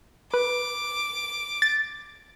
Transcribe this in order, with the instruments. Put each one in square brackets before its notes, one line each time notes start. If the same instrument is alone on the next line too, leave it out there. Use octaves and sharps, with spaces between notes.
[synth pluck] B4 [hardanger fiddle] D6
[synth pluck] A6